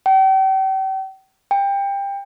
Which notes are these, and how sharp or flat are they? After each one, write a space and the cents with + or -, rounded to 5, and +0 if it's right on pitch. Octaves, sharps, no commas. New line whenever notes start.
G5 -40
G5 +20